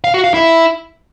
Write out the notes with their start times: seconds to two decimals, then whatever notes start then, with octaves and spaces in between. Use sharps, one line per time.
0.04 F5
0.14 F#4
0.24 F5
0.34 E4